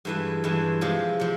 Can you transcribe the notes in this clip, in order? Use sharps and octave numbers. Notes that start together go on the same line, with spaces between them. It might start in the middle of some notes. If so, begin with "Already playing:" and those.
G2 E3 G#3 B4
G2 E3 G#3
C3 F3 G#3
C3 F3